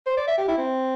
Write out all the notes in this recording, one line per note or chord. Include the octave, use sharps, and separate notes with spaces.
C5
D5
E5
G4
E4
C4